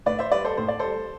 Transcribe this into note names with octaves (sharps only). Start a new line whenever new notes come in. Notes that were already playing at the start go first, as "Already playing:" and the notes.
A2 B4 D5
C5 E5
G3 B4 D5
A4 C5
A2 C5
D5
G3 A4 C5